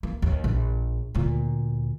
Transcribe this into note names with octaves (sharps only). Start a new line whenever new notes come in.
A#3
D#2
A#1
D2 A#2